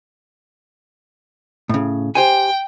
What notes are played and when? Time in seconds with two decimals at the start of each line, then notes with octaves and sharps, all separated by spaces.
1.69 A2 C#3
2.15 G4 C5 G5 G#5